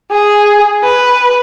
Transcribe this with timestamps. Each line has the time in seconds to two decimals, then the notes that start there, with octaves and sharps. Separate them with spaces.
0.12 G#4
0.84 B4